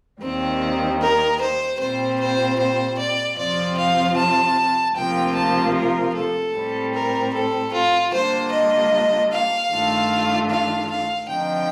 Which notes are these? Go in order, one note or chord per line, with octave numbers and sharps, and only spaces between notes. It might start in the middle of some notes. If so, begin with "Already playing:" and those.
D#2 D#3 G3 C4
A#4
C5
A#2 G3 C4 C5
C5
C5
D5
F2 C3 F3 C4 F4 D5
F5
A5
D2 C3 F3 A#3 F4 G5
A5
A#4
A4
A2 G3 C4
A#4
A4
F4
D3 G3 A#3 D4 F4 C5
D#5
F5
G2 D#3 A3 D4 F4
F5
F5
D3 F3 C4 D#4 G5